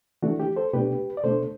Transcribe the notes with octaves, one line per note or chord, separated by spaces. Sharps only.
E3 A3 D4 F#4
G4
A4 C5
B2 A3 D4 G4 B4
D5
B2 A3 D4 A4 C5